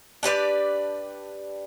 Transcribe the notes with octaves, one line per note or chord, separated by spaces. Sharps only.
D4 G4 B4 D5